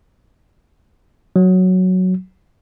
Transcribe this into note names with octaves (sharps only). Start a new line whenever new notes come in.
F#3